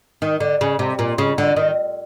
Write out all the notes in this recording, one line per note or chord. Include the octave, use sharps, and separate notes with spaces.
D#3
D3
C#3
C3
A#2
C#3
D3
D#3